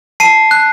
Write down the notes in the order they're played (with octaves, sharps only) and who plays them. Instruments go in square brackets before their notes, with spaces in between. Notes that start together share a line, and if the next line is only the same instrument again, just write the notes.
[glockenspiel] A5 C7 D#7
F#6